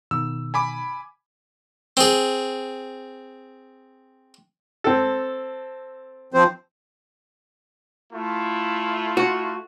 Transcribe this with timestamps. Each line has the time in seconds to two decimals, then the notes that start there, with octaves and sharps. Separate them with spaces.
0.11 B2 D#3 E6
0.54 G#5 B5 D6
1.97 C4 G#4
4.84 C4 A4
6.34 F3 C4 C5
8.11 A3 E4 F4
9.17 F#4